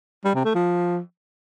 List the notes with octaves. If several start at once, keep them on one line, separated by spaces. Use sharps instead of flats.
G3
C3
A3
F3